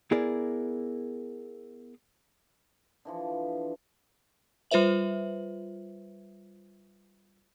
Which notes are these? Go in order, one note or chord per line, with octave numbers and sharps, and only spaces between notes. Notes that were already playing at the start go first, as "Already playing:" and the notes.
B3 E4 G#4 A#4 D5
D3 E3 F3
G3 F4 B4 C5 E5 F#7